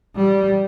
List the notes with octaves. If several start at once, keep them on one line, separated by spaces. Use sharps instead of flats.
G3